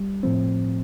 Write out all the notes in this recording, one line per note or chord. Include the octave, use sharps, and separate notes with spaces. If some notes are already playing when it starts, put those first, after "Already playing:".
Already playing: G3
A2 F3 C4